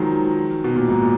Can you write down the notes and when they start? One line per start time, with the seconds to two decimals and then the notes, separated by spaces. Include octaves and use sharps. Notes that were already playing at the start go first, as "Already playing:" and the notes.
Already playing: D#3 F3 F#3 G#3
0.64 B2
0.76 A#2
0.89 G#2
1.02 A#2